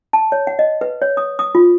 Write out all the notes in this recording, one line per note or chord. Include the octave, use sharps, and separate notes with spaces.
A5
C#5
F#5
D#5
B4
C#5
D#6
D#6
F4